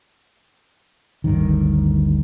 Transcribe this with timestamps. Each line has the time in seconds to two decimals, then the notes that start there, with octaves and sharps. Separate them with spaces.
1.24 G1 D2 G2 D#3